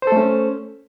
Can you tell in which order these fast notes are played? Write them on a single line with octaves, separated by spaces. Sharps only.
C5 A4 A3 C#4